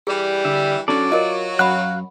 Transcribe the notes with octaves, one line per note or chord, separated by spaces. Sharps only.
E3 G3 G#4
D3 E5
F#3 C#4 D4 A4 D5
F4 A#4 D#5
F#2 F5 F#5 B5 F#6